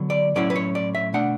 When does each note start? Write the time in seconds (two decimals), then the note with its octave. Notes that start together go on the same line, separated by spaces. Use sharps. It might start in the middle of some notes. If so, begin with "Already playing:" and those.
Already playing: D3 F#3 B3
0.10 D5
0.35 A2 F#3 C#4 E4 D5
0.50 B4
0.56 C#5
0.75 D5
0.95 E5
1.14 B2 A3 D4 F#5